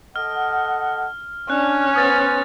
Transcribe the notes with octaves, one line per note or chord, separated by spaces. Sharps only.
A4 D#5 F#5 F6
C#4 D4 F#6
B3 C5 D#6 A6